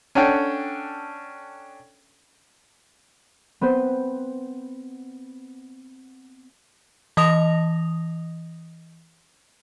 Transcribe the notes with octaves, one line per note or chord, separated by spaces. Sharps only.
C#4 D4 A4 F#5 G5
B3 C4 B4 C5
E3 D#5 D#6 A#6 F7